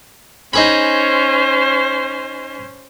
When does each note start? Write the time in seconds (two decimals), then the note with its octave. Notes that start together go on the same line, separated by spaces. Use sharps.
0.53 C#4 D#4 G#4 C5 B5